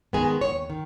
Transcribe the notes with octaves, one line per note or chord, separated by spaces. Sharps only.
D#3 G#3 B3 G#4
D#2 C#5
D#3